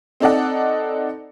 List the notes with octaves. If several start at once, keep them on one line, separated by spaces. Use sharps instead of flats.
C4 D#4 A4 D5 D#5 F#5